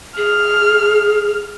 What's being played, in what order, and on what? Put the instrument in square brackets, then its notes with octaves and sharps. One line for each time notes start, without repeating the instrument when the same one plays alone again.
[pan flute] G#4 [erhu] F6